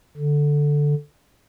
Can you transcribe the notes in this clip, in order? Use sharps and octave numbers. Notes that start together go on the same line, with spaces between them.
D3